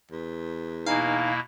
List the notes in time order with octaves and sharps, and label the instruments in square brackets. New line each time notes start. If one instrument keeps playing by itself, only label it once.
[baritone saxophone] E2
[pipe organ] B2 A#3 E4 [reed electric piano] D#4 G#5 A#5 [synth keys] F5